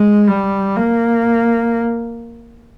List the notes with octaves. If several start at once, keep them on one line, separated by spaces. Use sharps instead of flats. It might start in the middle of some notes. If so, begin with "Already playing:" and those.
Already playing: G#3
G3
A#3